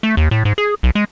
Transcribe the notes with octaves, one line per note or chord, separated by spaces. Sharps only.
A3
D#2
A2
G#2
G#4
B1
G#3